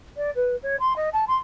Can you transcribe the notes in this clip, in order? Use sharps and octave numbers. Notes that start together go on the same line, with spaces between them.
D5
B4
C#5
C6
D#5
A5
C6